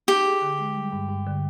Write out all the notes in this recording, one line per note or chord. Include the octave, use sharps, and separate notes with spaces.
D#4 G4
G#4
D3
G#3
G3
G2
G2
D3